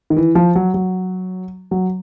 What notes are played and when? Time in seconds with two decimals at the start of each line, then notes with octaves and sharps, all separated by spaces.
0.10 D#3
0.17 E3
0.35 F3
0.55 F#3
0.74 F#3
1.71 F#3